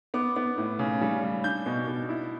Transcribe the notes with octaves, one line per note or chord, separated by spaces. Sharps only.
B3 D6
B3
A2
C#3
G3
C#3
D4 G6
B2
B2
E4